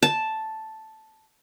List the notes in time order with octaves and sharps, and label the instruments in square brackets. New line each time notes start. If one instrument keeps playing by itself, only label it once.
[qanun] A5